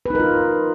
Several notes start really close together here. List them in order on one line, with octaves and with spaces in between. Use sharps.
B4 D#4 A#4 F4